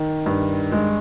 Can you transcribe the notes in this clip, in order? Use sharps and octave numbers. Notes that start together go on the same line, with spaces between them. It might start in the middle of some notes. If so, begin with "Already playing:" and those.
Already playing: D#3
G2
G#3